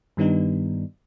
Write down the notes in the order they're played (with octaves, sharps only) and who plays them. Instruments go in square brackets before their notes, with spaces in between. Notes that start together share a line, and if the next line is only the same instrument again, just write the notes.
[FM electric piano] G2 D#3 G3 B3 D4 D#4